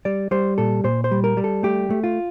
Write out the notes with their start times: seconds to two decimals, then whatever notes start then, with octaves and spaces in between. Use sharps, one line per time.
0.05 G3 D5
0.31 G3 C5
0.58 A#2 A4
0.84 A#2 C5
1.04 C5
1.11 G3
1.24 A#4
1.37 G3
1.44 A4
1.63 A3 G4
1.90 A3
2.04 F4